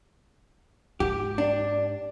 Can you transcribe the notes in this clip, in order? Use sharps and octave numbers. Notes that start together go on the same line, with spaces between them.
G#2 G4
D4